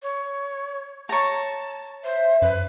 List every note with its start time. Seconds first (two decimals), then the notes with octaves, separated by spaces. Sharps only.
0.03 C#5
1.09 C#5 A5 A#5
2.04 C5 E5
2.42 F#2 B4